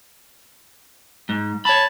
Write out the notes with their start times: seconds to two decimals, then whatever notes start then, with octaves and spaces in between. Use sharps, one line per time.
1.29 G#2
1.65 C#5 A5 B5